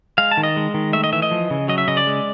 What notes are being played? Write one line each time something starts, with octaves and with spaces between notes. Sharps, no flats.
G#3 F5
A5
D#3
D#5
G#3
D#3
A3 E5
D#5
E3 E5
D#5
F3
C#3
F#3 D#5
E5
C#3 D#5
D5
G#3